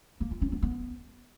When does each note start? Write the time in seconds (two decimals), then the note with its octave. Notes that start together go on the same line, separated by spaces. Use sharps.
0.20 A#3
0.31 F4
0.41 C#4
0.52 B3
0.63 B3